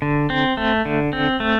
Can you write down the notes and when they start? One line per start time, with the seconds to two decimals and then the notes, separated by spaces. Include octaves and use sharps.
0.02 D3
0.30 C4
0.57 A3
0.85 D3
1.13 C4
1.40 A3